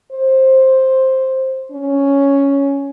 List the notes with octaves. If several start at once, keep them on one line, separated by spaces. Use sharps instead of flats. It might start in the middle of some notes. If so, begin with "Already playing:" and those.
C5
C#4